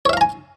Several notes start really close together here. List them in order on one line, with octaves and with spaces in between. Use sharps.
C#5 E5 F5 A#5 G#5